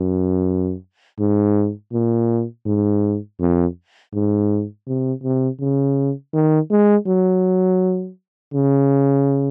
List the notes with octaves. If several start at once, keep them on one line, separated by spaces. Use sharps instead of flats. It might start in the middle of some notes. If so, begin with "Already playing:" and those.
Already playing: F#2
G#2
A#2
G#2
F2
G#2
C3
C3
C#3
D#3
G#3
F#3
C#3